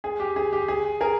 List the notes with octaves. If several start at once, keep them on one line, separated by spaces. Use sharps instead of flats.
G#4
G4
G#4
G4
G#4
G#4 A#4